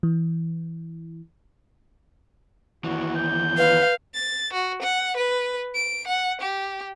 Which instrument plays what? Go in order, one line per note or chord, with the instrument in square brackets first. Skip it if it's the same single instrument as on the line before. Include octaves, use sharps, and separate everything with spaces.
[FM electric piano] E3
[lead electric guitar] D#2 E3 [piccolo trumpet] F#4
[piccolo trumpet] G6
[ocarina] B4 [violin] F5
[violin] A6
F#4
F#5
B4
D7
F#5
G4